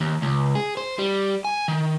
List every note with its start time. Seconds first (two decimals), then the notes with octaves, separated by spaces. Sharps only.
0.01 D#2
0.22 C#2
0.55 G#4
0.77 C5
0.99 G3
1.45 G#5
1.68 D#3